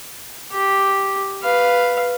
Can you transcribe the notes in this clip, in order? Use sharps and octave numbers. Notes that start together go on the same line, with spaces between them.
G4
B4 F5